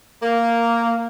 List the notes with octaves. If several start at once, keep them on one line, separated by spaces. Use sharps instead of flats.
A#3